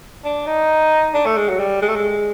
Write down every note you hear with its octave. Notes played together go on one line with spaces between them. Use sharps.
D4
D#4
D4
A3
G#3
F#3
G3
G#3
A3
G#3